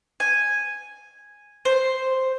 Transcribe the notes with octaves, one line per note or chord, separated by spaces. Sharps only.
G#5
C5